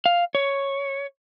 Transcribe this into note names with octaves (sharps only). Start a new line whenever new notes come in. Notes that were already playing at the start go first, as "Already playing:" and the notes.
F5
C#5